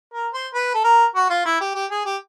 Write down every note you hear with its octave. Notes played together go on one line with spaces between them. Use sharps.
A#4
C5
B4
A4
A#4
F#4
F4
E4
G4
G4
G#4
G4